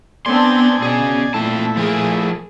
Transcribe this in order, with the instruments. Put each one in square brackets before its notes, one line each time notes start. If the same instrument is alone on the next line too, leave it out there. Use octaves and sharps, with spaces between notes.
[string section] B3 C4 D4 [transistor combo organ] D5 G#5 [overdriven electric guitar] C6
[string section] B2 [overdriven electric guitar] C#4 G#4
[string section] A#2 [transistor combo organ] A3 E4 [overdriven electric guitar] C4 A5
[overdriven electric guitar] F3 A#4 [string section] G#4